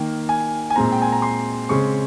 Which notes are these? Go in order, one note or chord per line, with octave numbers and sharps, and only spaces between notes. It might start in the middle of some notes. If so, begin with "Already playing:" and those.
Already playing: D#3 A#3 G5
G#5
G#5
A#2 G#3 C4 A#5
G5
G#5
A#5
C6
C#3 G#3 C4 C#6